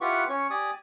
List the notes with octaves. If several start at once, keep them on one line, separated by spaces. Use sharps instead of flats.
E4 F4 G4 B4 F#5 C#6
C#4 C#5 C#6
G4 D5 G#5 D#6